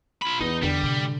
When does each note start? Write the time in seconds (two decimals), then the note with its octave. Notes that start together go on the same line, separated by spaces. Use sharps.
0.22 F4 B5
0.40 E2 B3 D#4 F4
0.63 E2 D3 E3 G3
0.81 A2 C3